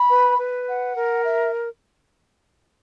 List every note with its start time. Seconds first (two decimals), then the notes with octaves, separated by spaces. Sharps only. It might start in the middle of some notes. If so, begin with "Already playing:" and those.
Already playing: B5
0.09 B4
0.38 B4
0.67 F#5
0.96 A#4
1.25 E5